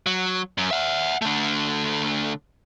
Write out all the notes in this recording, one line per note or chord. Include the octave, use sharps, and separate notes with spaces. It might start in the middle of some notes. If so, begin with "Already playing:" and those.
F#3
F#2
E5 F#5
D3 A3